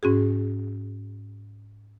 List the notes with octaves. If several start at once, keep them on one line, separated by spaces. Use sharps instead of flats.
G#2 C#4 F#4 G#4